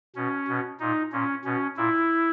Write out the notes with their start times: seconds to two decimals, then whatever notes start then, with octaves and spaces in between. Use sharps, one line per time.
0.16 B2 C#4
0.48 B2
0.80 A#2 D#4
1.12 A#2 C#4
1.45 B2 C#4
1.77 A#2 E4